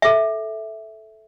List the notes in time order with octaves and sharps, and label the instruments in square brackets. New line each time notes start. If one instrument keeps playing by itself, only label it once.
[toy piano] A4 E5